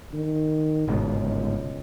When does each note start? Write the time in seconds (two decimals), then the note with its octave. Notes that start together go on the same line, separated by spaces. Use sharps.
0.13 D#3
0.88 G1 C#2 G#2 B2